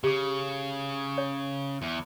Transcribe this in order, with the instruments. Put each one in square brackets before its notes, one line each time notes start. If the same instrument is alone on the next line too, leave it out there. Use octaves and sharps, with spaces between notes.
[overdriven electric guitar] C#3 [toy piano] G4 D6
[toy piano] C#5
[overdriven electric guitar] E2